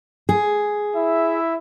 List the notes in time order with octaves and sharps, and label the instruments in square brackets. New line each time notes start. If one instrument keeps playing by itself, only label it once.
[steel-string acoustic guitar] G#4
[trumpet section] E4 E5